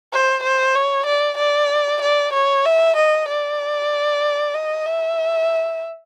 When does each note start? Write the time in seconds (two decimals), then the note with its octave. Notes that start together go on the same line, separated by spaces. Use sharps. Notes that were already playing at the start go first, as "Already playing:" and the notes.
0.12 C5
0.43 C5
0.75 C#5
1.06 D5
1.37 D5
2.02 D5
2.33 C#5
2.65 E5
2.96 D#5
3.28 D5
4.54 D#5
4.85 E5